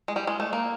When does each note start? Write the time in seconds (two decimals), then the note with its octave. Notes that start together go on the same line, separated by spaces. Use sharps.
0.08 G#3
0.16 G3
0.27 G#3
0.40 A3
0.53 A#3